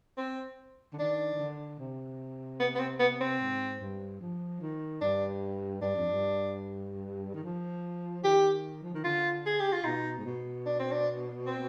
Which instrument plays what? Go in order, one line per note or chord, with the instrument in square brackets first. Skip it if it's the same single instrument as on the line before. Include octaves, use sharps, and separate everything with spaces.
[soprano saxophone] C4
[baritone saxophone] D3
[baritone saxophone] D#3 [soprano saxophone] D4
[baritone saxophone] D#3
D3
C3
[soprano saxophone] B3
B3
C4
B3
C4
[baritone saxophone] G#2
G2
F3
D#3
[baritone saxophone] G2 [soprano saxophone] D4
[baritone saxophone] G2 [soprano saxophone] D4
[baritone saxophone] F2
G2
D#3
F3
[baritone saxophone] D#3 [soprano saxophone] G4
[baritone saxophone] F3
D#3
[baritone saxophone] D3 [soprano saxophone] F4
[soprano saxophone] G#4
G4
F4
[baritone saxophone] B2 [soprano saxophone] D#4
[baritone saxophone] G#2
B2
[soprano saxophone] D4
C4
D4
C4